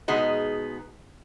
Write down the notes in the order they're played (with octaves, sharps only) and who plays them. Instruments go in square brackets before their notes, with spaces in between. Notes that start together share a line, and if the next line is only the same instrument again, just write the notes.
[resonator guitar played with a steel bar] B2 G#3 B3 D#4 G#4 D#5